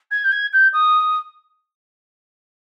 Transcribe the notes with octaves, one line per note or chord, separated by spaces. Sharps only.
G#6
G6
G#6
G6
D#6